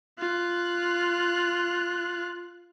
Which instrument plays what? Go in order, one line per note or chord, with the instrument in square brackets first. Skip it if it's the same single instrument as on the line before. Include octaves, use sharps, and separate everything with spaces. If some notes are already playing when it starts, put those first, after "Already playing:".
[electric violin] F4 F#6